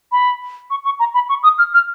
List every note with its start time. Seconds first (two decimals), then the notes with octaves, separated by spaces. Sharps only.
0.12 B5
0.70 C#6
0.85 C#6
0.99 A#5
1.14 B5
1.29 C#6
1.43 D#6
1.58 F6
1.74 F6